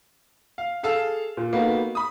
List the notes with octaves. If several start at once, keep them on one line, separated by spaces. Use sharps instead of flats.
F5
G#4 A4 F5 A5 E6
A#2
A#3 B3 D#4 F#4 A4
B5 D#6